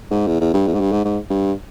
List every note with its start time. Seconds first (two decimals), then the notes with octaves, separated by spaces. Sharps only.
0.11 G#2
0.27 E2
0.40 E2
0.53 G2
0.67 E2
0.74 G#2
0.80 G2
0.92 G#2
1.05 G#2
1.30 G2